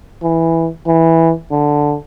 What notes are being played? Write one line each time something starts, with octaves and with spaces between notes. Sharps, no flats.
E3
E3
D3